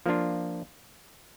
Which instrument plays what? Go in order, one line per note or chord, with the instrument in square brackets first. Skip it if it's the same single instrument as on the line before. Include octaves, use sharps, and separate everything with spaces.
[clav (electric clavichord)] F3 A#3 D4 F4